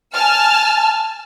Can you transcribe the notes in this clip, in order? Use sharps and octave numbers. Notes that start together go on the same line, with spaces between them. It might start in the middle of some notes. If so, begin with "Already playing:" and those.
G#5 A5 F6